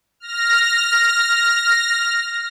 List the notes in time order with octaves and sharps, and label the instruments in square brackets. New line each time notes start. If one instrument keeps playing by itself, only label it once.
[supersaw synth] F6 A#6